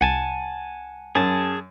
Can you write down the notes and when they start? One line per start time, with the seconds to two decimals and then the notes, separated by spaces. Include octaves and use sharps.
0.01 C2 F#5 G#5 A5
1.15 F#2 G#4 A5